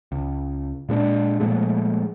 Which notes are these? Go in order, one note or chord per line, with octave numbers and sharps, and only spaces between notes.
C#2
A#2 G#3 A3 D4
A#2 F3 G#3 A3